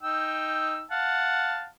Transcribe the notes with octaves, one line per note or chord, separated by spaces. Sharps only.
D#4 G5 E6
F5 F#5 A5